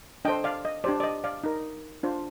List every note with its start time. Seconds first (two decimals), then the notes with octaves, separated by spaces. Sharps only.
0.25 D4 A4 C5 D#5 G5
0.44 D5 F5
0.65 D#5
0.84 D4 G4 C5 D5
1.00 D5
1.03 D#5
1.24 D5 F5
1.44 D#4 A#4
2.03 D4 F4 C5